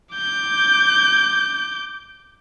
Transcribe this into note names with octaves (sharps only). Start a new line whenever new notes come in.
D6 G6